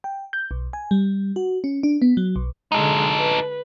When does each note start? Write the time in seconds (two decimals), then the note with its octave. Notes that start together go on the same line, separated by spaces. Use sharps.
0.04 G5
0.33 G6
0.51 B1
0.73 G#5
0.91 G3
1.36 F#4
1.64 C#4
1.83 D4
2.02 B3
2.17 F#3
2.36 B1
2.72 D3 G#3 D#4 A4
3.17 B4